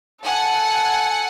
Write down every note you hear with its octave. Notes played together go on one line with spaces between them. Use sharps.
A4 F#5 G#5